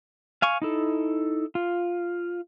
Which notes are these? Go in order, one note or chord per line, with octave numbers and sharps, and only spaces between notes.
F5 G#5 C#6
D#4 E4 A4
F4